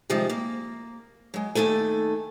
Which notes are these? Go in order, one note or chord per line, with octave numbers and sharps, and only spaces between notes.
C3 D#3 F3 G3 G#3
A#3
F#3 G#3
D#2 D#3 A3 A4 G#5